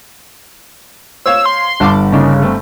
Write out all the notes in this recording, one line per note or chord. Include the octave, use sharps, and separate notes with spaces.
C5 C#5 F5 E6
C6
G1 F#5 A5 D6
C#3 A#3 D4 D#4
A3 C4